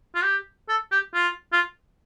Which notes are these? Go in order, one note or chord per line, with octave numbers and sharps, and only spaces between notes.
F4
G4
A4
G4
F4
F4